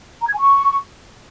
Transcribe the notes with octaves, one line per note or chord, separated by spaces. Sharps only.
A#5
G#6
G#5
C#6